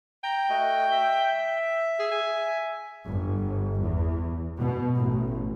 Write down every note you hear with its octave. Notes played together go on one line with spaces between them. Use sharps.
G5 A#5
A3 F#4 D#5
E5
G#4
G#5
G1
E2
B2
A1